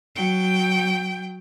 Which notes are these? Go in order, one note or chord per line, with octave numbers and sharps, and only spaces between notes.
F#3 G5